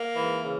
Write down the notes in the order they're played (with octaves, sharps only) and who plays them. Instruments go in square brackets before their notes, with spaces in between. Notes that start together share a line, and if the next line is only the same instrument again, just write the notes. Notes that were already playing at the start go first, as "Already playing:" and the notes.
Already playing: [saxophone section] A#3
G#2 E3
C#3 E3